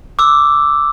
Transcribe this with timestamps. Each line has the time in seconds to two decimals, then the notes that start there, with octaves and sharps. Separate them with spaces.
0.19 D6 E6